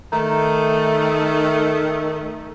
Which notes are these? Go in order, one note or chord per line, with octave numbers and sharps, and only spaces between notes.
D#3 A3 A#5